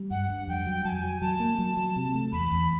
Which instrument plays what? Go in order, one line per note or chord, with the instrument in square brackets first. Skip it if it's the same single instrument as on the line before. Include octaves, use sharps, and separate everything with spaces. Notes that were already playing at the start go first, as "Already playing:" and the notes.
Already playing: [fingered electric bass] G3
[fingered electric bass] G2 [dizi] F#5
[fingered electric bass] G2
[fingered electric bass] F2 [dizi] G5
[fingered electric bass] F#3
[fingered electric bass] F#3 [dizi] G#5 A5
[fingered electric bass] F#3
[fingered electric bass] F#3 [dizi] A5
[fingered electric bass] A#3
F#3
F#3
C3
A3
[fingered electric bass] E2 [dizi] B5
[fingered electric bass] E2